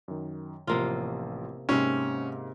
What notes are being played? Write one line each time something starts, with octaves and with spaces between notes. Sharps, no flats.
F#2 D#3
A1 C3 F3 A#3 F4
G#2 C3 A#3 C4 C#4